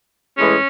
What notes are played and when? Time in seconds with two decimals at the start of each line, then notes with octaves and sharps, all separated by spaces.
0.38 A2 E3 G#3 C#4